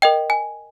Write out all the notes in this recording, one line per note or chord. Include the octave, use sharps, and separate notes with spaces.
A#4 D#5 G5
G#5